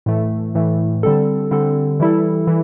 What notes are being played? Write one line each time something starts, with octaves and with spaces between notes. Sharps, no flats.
A2 E3 A3
A2 E3 A3
D3 G3 C4 A4
D3 G3 C4 A4
E3 G3 E4 A4
E3